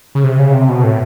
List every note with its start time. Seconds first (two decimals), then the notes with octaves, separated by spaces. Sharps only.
0.15 C#3
0.24 C3
0.39 C#3
0.54 C3
0.69 B2
0.84 A2